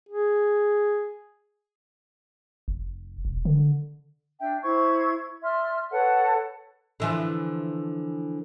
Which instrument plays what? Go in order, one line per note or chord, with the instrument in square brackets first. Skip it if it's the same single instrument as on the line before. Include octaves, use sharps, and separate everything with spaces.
[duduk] G#4
[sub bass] F1
E1
D3
[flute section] D4 E5 G5
E4 C5 C#6 G#6
D5 E5 C6 F6
A4 B4 C#5 F#5
[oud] D3 E3 F3